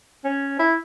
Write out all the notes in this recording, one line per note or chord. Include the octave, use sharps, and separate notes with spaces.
C#4
E4